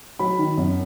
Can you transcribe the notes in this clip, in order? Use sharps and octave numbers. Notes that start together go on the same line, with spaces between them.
F#3 B5
D#3
F#2